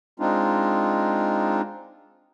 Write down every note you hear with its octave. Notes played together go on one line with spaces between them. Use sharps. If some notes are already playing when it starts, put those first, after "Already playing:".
G#3 C4 D4 D#4 F4